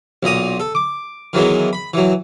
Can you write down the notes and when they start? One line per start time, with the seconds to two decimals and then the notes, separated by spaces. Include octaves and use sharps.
0.23 B1 A#2 A#5 D#6
0.60 A4
0.75 D6
1.33 D#3 E3 F#3 G#3 B3
1.73 B5
1.94 E3 F#3